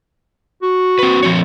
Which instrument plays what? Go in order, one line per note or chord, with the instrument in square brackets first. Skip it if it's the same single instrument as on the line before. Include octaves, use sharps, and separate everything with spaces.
[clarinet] F#4
[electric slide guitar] C4 B4
F3 C4 C#5